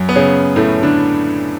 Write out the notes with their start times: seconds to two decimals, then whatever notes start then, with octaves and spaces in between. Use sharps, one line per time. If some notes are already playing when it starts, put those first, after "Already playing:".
Already playing: F#2 F#3
0.09 B3
0.16 C#3 C#4
0.56 A2 A3
0.83 D3 D4